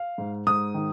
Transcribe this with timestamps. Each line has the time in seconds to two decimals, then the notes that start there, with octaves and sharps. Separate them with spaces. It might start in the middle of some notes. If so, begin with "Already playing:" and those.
Already playing: F5
0.18 G#2
0.47 G#2 D#6
0.74 D#3